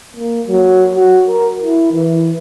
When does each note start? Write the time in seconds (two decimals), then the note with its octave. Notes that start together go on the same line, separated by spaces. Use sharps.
0.17 A#3
0.47 F#3
0.95 F#4
1.27 A#4
1.62 E4
1.93 E3